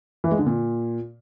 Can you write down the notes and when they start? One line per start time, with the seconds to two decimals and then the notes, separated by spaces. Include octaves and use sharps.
0.24 E3
0.31 G#3
0.39 D3
0.46 A#2